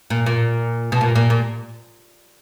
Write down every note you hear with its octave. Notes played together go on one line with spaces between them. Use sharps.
A#2
A#2
B2
A#2
A#2
A#2